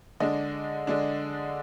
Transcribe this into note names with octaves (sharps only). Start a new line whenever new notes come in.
D3 G#3 D4 D#5
D3 G#3 D4